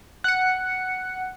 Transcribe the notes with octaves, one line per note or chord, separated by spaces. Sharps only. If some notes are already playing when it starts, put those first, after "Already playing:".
F#5 C#7